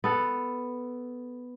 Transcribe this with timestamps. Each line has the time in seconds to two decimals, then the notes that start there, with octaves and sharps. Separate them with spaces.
0.04 B3 A4